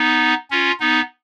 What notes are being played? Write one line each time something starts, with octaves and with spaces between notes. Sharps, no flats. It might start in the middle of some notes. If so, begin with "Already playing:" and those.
Already playing: B3 D#4
C#4 F4
B3 D#4